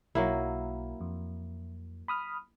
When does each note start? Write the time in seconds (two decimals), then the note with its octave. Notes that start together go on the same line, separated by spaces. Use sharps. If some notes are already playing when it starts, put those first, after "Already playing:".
0.15 B1 F#3 A#3 E4
1.01 F2
2.08 B5 D#6 F6